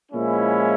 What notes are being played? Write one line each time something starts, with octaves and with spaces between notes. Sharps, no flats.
A#2 F3 G#3 C#4 E4